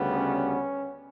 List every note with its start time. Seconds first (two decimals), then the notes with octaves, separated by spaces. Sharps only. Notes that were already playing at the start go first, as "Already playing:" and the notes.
Already playing: D2 C#3 G3 B3
0.13 C#4